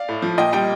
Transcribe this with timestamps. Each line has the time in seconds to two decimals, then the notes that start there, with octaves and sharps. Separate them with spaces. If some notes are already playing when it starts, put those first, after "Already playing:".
Already playing: D5 F5
0.09 A2
0.22 F3
0.37 A#2 D#5 G5
0.53 G3 D#5 G5